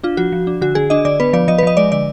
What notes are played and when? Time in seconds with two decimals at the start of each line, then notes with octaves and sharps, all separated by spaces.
0.03 D4 F4
0.17 F3 F#4
0.32 F3
0.47 D4
0.61 D3 F#4
0.75 D3 G#4
0.90 D4 D#5
1.05 D3 D5
1.20 B3 B4
1.33 F3 D5
1.48 F3 D#5
1.58 B4
1.63 F3 D#5
1.77 G#3 D5
1.92 D3 D5